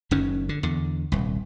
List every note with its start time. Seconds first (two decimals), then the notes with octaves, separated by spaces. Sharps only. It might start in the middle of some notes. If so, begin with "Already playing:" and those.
0.11 F#1 F#2 D#3 C#4
0.49 D3
0.63 E2 D3
1.12 D#1 C2